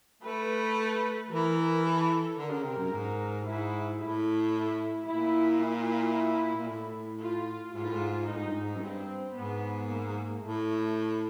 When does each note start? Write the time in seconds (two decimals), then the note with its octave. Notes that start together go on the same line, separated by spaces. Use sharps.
0.22 A3 B4
1.30 E3 A#4
1.83 A4
2.37 D3 A#4
2.50 C#3
2.64 C3
2.77 F#2
2.91 G#2
3.44 G#2 E4
3.98 A2 E4
4.51 E4
5.05 A#2 E4
5.60 E4
6.55 A#2
6.67 A2
7.21 F4
7.74 G#2 F4
7.83 A2
7.93 G#2
8.27 A2 D#4
8.36 G#2
8.44 G2
8.52 G#2
8.76 F#2
8.82 G2 C4
9.35 G#2 B3
9.89 A#3
10.42 A2 A3